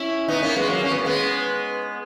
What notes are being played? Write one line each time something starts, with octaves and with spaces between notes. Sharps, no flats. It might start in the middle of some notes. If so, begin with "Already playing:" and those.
Already playing: C#4 E4
B3 D#4
A#3 C#4
G#3 B3
F#3 A#3
C#4
B3
A#3
G#3 B3